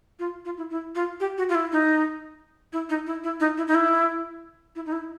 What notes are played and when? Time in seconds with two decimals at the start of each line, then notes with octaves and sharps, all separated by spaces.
0.19 F4
0.45 F4
0.57 E4
0.70 E4
0.95 F4
1.20 G4
1.38 F#4
1.49 F4
1.55 E4
1.72 D#4
2.73 E4
2.89 D#4
3.07 E4
3.24 E4
3.40 D#4
3.58 E4
3.67 D#4
3.75 E4
4.75 E4
4.86 D#4
4.92 E4